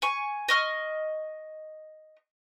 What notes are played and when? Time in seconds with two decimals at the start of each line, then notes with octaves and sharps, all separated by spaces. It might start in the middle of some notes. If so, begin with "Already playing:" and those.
0.02 G#5 C#6
0.49 D#5 C#6 F6